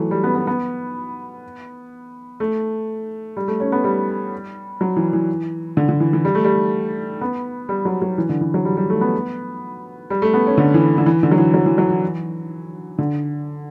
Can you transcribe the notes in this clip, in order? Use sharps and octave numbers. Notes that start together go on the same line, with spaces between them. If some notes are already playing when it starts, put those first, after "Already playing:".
Already playing: E3 F#3 A3
G3
B3
B3
B3
A3
G3
A3
C#4
B3
G3
F#3
E3
E3
D3
D3
E3
E3
G3
A3
G3
B3
G3
F#3
F#3
E3
D3
E3
F#3
G3
G3
A3
B3
G3
A3
B3
C#4
D3
E3
D3
E3
D3
F#3
E3
F#3
E3
F#3
E3
D3